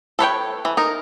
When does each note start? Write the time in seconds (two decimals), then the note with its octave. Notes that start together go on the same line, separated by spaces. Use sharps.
0.19 A4 B4 C#5 G5
0.65 E3
0.77 D#4 A#4